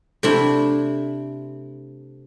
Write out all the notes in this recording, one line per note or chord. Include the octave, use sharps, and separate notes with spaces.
C3 A3 D4 E4